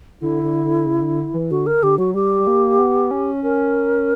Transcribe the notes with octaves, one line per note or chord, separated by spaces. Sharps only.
D3 E4
D3
D3
C#3
D3
E3
D3 F#4
A#4
D3 G4
F#3 F#4
G3 G4
G3
A#3
B3
C#4
C#4 A#4